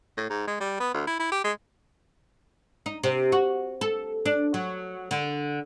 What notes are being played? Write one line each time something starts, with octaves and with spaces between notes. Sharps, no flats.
A2
G#2
G#3
G3
B3
D2
E4
E4
G4
G#3
D#4
C3
F#4
A4
D4
F#3
D3